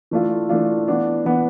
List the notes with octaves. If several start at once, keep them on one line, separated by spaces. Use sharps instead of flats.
E3 A3 D4 F4
E3 A3 D4 F4
E3 B3 D4
E3 B3 D4